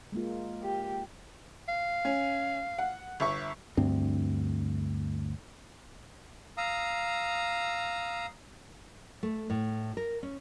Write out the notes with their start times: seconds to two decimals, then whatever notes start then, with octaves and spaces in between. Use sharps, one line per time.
0.12 G#3 A#3 F4
0.63 G4
1.68 F5
2.05 C#4
2.79 F#5
3.20 G1 E5 C#6
3.77 D2 G2 C4
6.57 F5 A#5 D#6 E6
9.23 A3
9.50 A2
9.97 A#4
10.23 C#4